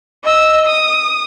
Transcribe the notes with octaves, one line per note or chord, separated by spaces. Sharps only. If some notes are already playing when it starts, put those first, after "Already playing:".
D#5 E6
D#6